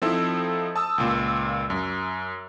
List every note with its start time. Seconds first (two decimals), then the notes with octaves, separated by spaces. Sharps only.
0.02 F3 C4 D#4 E4 A4
0.76 A5 D#6 E6
0.98 C#2 A#2
1.70 F#2